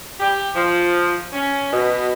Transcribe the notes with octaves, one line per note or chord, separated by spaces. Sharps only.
G4
F3
C#4
B2